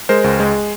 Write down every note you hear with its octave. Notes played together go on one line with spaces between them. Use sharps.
G#3 A#4 C5
C#2
G#3